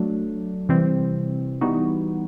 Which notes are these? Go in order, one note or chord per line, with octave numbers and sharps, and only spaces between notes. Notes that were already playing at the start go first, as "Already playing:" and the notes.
Already playing: F#3 A3 D4
C3 E3 G3 C4
E3 G3 B3 D#4 F#4